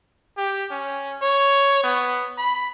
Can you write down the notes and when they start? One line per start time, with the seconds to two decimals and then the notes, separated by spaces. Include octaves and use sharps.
0.37 G4
0.71 C#4
1.22 C#5
1.84 B3
2.38 B5